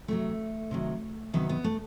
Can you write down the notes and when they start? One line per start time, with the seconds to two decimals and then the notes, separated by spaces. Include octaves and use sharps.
0.08 C3 D#3 F#3 A3
0.71 C3 D#3 F#3
1.33 C3 D#3 F#3 B3
1.49 B3
1.64 A3